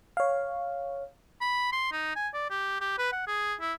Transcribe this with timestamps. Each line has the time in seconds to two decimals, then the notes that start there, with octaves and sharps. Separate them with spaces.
0.17 C#5 F5
1.41 B5
1.72 C6
1.92 D#4
2.16 G#5
2.34 D5
2.50 G4
2.80 G4
2.98 B4
3.13 F#5
3.27 G#4
3.61 E4